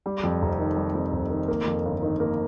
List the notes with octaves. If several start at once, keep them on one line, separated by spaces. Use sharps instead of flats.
G3
F2
F1
D#3
G3
F2
F1
D#3
A#3
F2
G1
D#3
A#3